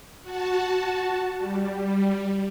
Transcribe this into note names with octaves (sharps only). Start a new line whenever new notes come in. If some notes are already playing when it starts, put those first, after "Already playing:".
F#4 A5
G3